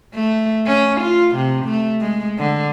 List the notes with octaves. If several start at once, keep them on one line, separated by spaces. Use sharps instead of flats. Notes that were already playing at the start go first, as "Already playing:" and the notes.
A3
C#4
F4
C3
A3
G#3
D3